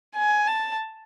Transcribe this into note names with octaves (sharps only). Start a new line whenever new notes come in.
G#5
A5